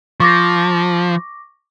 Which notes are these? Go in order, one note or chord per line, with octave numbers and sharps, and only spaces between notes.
F3 C#6 D6 A#6